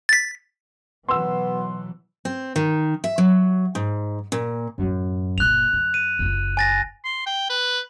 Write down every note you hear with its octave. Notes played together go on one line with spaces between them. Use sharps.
A6 B6
B2 E3 F#3 B3 C6 E6
C4
D#3
E5
F#3
G#2
A#2
F#2 A2
F#1 A#2 F#6 F7
F#2
D#7
F#1 F4
G#5 A6 A#6
C6
G5
B4